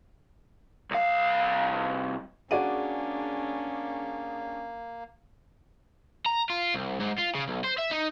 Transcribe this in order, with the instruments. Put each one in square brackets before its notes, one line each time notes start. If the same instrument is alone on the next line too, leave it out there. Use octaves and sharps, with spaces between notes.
[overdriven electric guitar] C2 F5
[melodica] A#3 [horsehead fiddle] C#4 D4 [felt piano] F#4 D5 D#7 [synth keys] G#4
[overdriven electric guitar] A#5
F4
C2
G#2
F4
C#3
B1
C5
E5
D#4